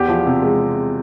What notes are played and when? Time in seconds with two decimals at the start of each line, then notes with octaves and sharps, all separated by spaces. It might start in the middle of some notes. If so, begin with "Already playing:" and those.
Already playing: E2 G4
0.08 F3
0.26 C3
0.42 G#3